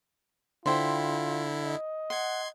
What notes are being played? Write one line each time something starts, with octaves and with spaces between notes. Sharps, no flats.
D3 E4 F4 C5 G5 B5
D#5
F#5 C6 G#6